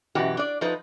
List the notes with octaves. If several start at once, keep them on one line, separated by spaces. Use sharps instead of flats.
F#2 B2 E3 F#4 G4
D4 D5
F3 D#4 B4